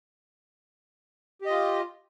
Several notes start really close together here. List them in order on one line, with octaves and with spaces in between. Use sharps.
G4 D#5 F4